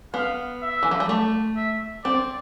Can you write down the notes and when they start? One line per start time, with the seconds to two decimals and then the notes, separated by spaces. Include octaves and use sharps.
0.13 B3 F5
0.62 E5
0.83 E3
0.91 F3
1.00 G3
1.09 A3
1.56 E5
2.04 C4 D5